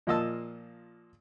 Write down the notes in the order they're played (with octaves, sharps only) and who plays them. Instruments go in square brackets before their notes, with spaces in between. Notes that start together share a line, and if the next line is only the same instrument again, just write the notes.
[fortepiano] A#2 F3 A#3 D#5 A5 E6